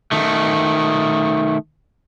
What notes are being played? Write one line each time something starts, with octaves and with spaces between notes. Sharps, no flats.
D#3 A3